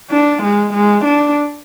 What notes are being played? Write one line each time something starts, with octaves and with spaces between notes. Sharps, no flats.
D4
G#3
G#3
D4